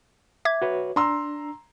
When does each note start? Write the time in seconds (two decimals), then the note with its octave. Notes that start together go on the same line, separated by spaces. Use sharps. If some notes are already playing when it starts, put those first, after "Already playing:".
0.45 E5 D6 G#6
0.62 F#4 B4 C#5
0.96 D4 A#5 C6 E6